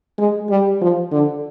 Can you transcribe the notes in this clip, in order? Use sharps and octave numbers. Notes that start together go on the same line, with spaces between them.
G#3
G3
F3
D3